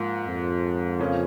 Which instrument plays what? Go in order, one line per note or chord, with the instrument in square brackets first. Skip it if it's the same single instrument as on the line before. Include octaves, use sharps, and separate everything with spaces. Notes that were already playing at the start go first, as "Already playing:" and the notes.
Already playing: [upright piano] G#2 F3 A#3
[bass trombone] F2
[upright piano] C#3 F3 A#3 C#4